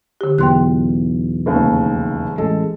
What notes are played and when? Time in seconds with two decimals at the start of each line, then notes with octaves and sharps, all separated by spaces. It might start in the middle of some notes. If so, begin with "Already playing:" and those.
0.21 D3 G4
0.38 B1 E2 G5 C6 F#6
1.46 F1 D#2 C#3
2.38 A1 G#3 A4